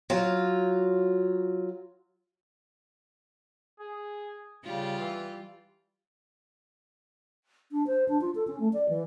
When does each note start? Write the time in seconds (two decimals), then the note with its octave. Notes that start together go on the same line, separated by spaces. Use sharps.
0.10 F#3 F4
3.80 G#4
4.64 C#3 G3 F4
4.98 E3
7.72 D4
7.87 C5
8.08 D4
8.21 F4
8.35 A4
8.47 C#4
8.60 A3
8.73 D5
8.89 E3